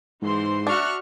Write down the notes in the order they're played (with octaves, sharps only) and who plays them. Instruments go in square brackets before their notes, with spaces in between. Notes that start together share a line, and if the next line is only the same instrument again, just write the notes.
[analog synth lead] G#2 [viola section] E3 C5 C6
[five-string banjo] D4 [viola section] F#4 E5 F#5 [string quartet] C#6 F6 F#6